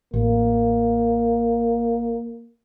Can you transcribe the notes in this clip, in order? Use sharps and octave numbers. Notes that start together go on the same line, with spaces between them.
A1 A#3